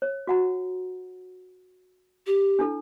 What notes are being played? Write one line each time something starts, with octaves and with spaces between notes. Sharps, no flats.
C#5
F#4 F#5 A#5
G4
D4 E4 A4